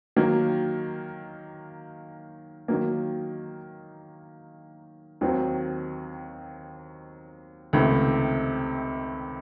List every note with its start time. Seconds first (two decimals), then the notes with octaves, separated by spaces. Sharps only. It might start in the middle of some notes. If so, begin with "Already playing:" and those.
0.16 D#3 F#3 A#3
2.68 D#3 F#3 A#3
5.21 D#2 D#3 F#3 C4 F#4
7.73 C#2 C3 D#3 A3